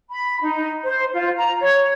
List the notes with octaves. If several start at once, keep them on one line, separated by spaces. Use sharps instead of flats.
B5
D#4
C5
F4
A#5
C#5